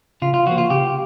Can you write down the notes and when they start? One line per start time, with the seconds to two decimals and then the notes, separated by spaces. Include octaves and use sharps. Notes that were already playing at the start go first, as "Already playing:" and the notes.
0.22 C#3 F4
0.34 F4
0.46 F3 A#3 F#4
0.58 F4
0.70 C#3 G4